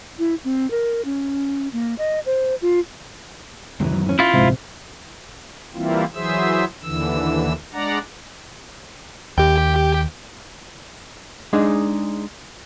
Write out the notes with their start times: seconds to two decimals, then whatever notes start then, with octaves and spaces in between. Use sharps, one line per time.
0.19 E4
0.44 C4
0.71 A#4
1.05 C#4
1.73 A#3
1.98 D#5
2.26 C5
2.62 F4
3.80 C#2 G2 D#3 E3 F#3
3.92 F#2 D#3
4.06 E3 C#4
4.19 C#4 E4 F4 E5
4.33 A#1 G#2 C3
5.74 E3 G3 A#3 C4 E4 F4
6.14 E3 F#3 G#4 C5 E5 E6
6.83 D#2 D3 E3 E6
7.73 G#3 D4 D5 F#5 A#5
9.38 D#2 G4 G5
11.53 G#3 D4 D#4 G#4